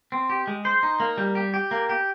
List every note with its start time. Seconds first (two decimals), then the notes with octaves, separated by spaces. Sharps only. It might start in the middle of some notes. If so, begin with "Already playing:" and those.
0.12 C4
0.30 G4
0.47 G#3
0.65 C5
0.83 D#4
1.00 A#3
1.18 G3
1.35 G4
1.54 G4
1.71 A#3
1.89 G4